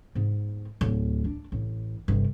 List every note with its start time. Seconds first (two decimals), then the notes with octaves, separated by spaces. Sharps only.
0.15 G#2 B3
0.81 D1
1.24 D4
1.52 A1
2.08 G1 C3